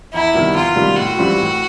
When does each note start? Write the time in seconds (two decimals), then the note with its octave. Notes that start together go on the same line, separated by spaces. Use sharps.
0.13 E2 E4
0.34 C3 D#3 G3 B3
0.54 E2 F4
0.75 C3 D#3 G3 B3
0.96 A2 F#4
1.17 E3 G3 C4 F4
1.38 A2